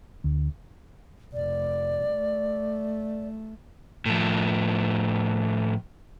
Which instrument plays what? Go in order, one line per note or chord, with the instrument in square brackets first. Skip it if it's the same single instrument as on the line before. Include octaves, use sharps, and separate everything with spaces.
[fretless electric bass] D2
[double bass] F1 [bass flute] D5
[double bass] A3
[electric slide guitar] A2 F3